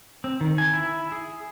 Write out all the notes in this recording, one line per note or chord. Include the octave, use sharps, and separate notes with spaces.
C4
D#3
G#5
E4
G#4